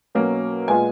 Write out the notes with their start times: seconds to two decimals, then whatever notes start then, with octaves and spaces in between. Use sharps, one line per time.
0.15 B2 F#3 A#3 C#4
0.68 A#2 G#3 B3 F4 G#5